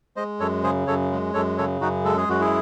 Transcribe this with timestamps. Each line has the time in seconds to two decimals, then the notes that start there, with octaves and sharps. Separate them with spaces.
0.16 G#3 C5 D#5
0.40 F#2 A4 C#5
0.63 C#3 G#4 C5
0.87 F#2 A4 C#5
1.12 G#3
1.34 F#2 A4 C#5
1.58 C#3 A4 C#5
1.81 F#2 D#4 F#4
2.05 G#3 A4
2.17 G#4
2.28 F#2 F#4
2.40 E4 G#4